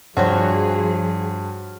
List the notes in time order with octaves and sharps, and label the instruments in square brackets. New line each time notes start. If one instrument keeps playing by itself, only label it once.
[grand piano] G2 [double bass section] F3 [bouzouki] F#4 C5 C#5 [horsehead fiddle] G#4